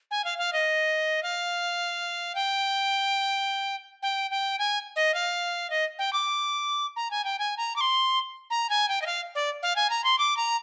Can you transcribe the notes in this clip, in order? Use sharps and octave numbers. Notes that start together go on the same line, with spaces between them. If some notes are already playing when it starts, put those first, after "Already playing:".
G#5
F5
F5
D#5
F5
G5
G5
G5
G#5
D#5
F5
D#5
G5
D6
A#5
G#5
G5
G#5
A#5
D6
C6
A#5
G#5
G5
D#5
F5
D5
F5
G#5
A#5
C6
D6
A#5